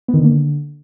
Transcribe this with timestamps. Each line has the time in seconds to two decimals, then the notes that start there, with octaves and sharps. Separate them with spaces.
0.08 B3
0.14 D#3
0.19 D3
0.24 A#3
0.29 D3